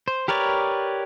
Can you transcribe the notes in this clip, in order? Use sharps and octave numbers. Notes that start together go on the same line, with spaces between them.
C5
G4 A#4 B4 C#5 D5